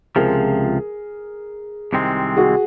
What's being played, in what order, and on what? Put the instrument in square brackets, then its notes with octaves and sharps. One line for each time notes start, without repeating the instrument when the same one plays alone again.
[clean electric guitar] C#2 C3 F3 [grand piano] G#4 A#4
[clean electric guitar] C2 C3 D#3 G#3 C4
[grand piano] F#4 G#4